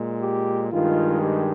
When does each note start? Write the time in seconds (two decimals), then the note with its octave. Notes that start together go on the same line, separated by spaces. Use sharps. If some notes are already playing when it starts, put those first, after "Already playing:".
Already playing: A#2 G#3
0.21 G4
0.71 G2 D#3 G#3 F4
1.21 G4